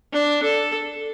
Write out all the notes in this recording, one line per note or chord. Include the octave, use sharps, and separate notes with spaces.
D4
A4